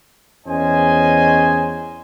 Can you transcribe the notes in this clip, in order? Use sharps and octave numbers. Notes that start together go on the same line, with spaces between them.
E2 C#4 C5 D#5 G#5